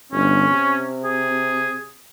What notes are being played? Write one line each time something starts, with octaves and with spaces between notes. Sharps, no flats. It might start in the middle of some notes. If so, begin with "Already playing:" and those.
G1 C#4
C3
G#4